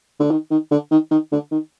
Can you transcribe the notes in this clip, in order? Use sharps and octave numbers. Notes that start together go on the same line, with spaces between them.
D3
D#3
D#3
D3
D#3
D#3
D3
D#3